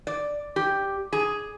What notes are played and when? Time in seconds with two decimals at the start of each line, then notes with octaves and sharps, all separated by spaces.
0.07 D5
0.56 G4
1.13 G#4